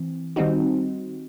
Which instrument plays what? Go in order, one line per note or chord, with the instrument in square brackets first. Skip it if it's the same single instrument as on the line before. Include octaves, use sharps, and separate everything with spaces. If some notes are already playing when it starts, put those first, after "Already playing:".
Already playing: [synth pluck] E3 C4
D#3 G3 C4 D#4 F#4